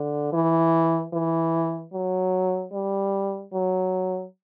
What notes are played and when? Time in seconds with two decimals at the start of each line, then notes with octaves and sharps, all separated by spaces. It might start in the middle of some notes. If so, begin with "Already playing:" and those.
Already playing: D3
0.33 E3
1.13 E3
1.94 F#3
2.73 G3
3.53 F#3